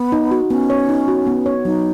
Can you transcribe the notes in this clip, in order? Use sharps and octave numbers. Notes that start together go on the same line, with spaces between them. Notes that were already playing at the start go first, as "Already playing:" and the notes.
Already playing: B3
D#4
F#4
B3 C#4
C#5
D#4
F#4
B3
C#5
F#3 D#4